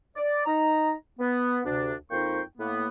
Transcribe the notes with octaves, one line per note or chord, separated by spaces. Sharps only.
D5
D#4 A#5
B3
D2 C3 D4
F2 A#3 D#4 C5 G5 C#6
A2 A#3 B3